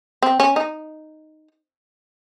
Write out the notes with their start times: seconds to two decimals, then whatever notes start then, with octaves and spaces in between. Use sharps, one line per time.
0.22 C4
0.40 C#4
0.56 D#4